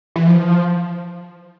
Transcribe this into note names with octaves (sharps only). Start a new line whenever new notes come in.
E3
F3